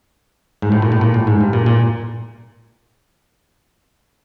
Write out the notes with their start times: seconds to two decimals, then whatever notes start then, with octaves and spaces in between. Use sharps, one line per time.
0.62 G#2
0.72 A2
0.82 A#2
0.92 A2
1.01 A#2
1.14 A2
1.27 G#2
1.40 G2
1.53 A#2
1.66 A#2